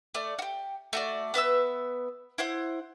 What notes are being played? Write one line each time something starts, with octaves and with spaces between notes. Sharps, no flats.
A3 D5
F#4 G4
A3 F#4 D5
B3 B4 E5 E6
E4 C5 F#5